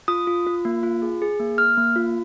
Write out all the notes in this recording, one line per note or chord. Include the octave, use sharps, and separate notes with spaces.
F4 D#6
F4
F4
A#3
F4
G#4
G#4
A#3
A#3 F6
A#3
F4